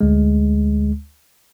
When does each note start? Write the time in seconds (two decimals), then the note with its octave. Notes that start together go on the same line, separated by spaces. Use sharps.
0.01 D2 G#3